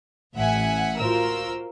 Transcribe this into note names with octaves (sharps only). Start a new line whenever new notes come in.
A1 E5 F#5 G#5
F4 F#4 A#4 C5 E6